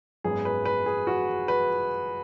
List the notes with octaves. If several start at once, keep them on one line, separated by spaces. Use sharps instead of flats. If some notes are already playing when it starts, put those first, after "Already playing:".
G#1 F#2 F#3 B3 G#4
B4
B4
G#4
F#4
B4